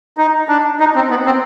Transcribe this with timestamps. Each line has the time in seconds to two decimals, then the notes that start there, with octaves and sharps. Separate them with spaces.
0.17 D#4
0.48 D4
0.80 D#4
0.95 C4
1.10 B3
1.26 C4